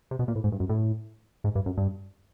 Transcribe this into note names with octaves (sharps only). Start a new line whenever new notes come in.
C3
B2
A#2
A2
G#2
G2
F#2
A2
G#2
G2
F#2
G2